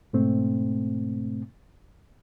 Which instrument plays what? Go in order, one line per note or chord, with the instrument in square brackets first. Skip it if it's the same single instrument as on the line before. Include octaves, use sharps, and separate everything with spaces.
[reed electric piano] G#2 B2 A3 C4